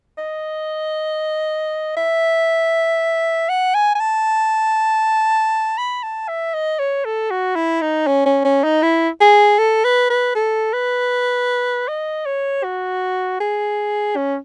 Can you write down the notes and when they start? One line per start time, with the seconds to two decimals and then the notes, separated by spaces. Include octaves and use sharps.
0.18 D#5
1.96 E5
3.49 F#5
3.74 G#5
3.95 G#5
4.00 A5
5.78 B5
6.03 A5
6.28 E5
6.54 D#5
6.79 C#5
7.05 A4
7.30 F#4
7.55 E4
7.81 D#4
8.07 C#4
8.25 C#4
8.45 C#4
8.64 D#4
8.83 E4
9.21 G#4
9.58 A4
9.84 B4
10.10 B4
10.35 A4
10.73 B4
11.88 D#5
12.26 C#5
12.63 F#4
13.40 G#4
14.16 C#4